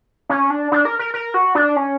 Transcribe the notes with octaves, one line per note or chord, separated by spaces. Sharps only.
C#4
D4
D4
A#4
A#4
A#4
F#4
D4
C#4